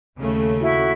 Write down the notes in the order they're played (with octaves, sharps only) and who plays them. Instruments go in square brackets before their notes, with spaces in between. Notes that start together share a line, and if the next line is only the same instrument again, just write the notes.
[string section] D#2 C#3 A3
[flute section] E4 F#4